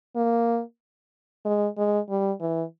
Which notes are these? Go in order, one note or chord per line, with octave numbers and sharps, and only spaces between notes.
A#3
G#3
G#3
G3
E3